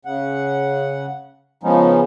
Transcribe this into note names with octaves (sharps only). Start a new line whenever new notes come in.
C#3 F#5
C#3 F3 G#3 B3 C#4 D#4